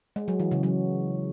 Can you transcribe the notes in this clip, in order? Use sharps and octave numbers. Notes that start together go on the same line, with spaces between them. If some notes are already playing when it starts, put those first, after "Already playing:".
G#3
F#3
E3
C#3
F#3